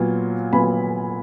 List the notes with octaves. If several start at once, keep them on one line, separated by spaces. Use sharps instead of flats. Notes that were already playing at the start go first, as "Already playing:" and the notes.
Already playing: A#2 F#3 B3 F4
A#2 F#3 B3 F4 G#5 B5